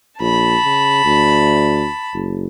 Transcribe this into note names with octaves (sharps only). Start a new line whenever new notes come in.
A#1 A5 B5
C#3
D2
F#1